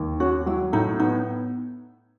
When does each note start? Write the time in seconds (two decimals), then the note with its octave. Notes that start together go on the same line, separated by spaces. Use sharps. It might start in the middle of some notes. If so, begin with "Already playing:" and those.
Already playing: D#2
0.20 C#4 F#4
0.46 F#3 E4
0.73 A2 D#4
0.99 B3 D#4